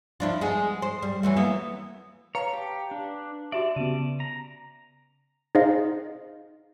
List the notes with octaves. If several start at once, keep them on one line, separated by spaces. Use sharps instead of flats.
F3 D4 E4
G#3 B3 G#4
C5
G3
E3 F#3 A3
A#3 B3 E4
B4 C#5 F5 A5 A#5
G4
D4
F#4 G4 D5 E5 A5
C#3 B3 D#7
A#5
D#4 G#4 C5 D#5 F5